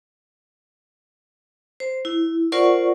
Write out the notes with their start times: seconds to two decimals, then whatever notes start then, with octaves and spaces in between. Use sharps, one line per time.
1.80 C5
2.05 E4
2.52 F4 A#4 C5 D5 F#5 C#6